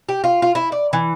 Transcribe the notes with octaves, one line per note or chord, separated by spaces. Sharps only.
G4
F4
F4
E4
D5
E3